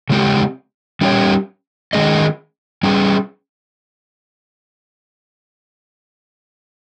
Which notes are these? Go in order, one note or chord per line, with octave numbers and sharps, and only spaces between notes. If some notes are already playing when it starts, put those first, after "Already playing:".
C#3 G#3 C4 G4
G3 C#4 G4 C#5
D#3 G#3 C#4 G#4 D#5
G3 C#4 G#4